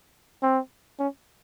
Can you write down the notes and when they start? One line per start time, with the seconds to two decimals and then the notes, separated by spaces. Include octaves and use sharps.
0.42 C4
0.99 C#4